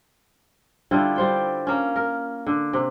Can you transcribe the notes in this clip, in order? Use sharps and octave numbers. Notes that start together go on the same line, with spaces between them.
D3 G3 E4 F4
G3 C5 G5
A#3 C#4
A#4
D3
C3